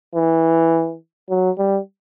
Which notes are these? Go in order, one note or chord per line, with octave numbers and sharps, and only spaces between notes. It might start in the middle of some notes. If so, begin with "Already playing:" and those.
E3
F#3
G3